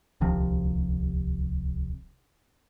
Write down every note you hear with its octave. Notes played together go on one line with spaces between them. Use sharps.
D1 C2 C3 F3